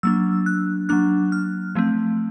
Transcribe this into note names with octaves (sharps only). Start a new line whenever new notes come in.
F#3 A#3 D4 E6
F#6
F#3 A#3 D4 F#6
F6
F3 A3 C4